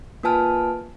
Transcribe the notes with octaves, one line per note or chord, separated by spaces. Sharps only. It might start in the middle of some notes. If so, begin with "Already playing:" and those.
A#3 F4 B4 G#5 A5 F6